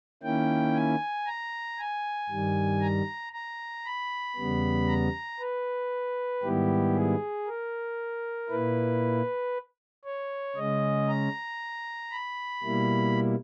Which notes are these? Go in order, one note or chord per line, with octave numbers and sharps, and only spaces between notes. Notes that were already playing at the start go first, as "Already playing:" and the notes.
D#3 A#3 C#4 E4 G5
G#5
A#5
G#5
G2 D#3 G3
A#5
A#5
B5
E2 C#3 G3 B3
A#5
B4
G#2 D#3 G3 B3 E4 G4
G#4
A#4
A#2 A#3 E4 B4
C#5
C#3 G#3 C#4 D#5
A#5
B5
B2 G3 A#3 E4